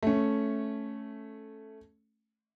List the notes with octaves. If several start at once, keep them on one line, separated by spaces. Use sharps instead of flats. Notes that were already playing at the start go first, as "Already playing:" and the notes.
A3 C#4